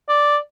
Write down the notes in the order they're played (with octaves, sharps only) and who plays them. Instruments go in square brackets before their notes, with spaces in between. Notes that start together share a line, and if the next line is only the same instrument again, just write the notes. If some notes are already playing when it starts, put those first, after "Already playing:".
[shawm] D5